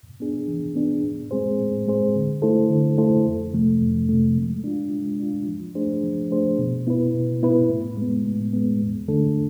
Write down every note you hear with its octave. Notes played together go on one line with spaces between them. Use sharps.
B3 D4 G#4
E3
B3 D4 G#4
A2
G#3 C4 G#4 C5
A2
G#3 C4 G#4 C5
D3
A3 E4 A4 C5
D3
A3 E4 A4 C5
F2
C3 F3 A3
F2
C3 F3 A3
G#3
D4 F4
G#3
D4 F4
F3
A3 D4 G#4 C5
F3
A3 D4 G#4 C5
B2
B3 E4 B4
B2
B3 E4 B4
A2
G#3 B3
A2
G#3 B3
E2
D3 A3 D4 A4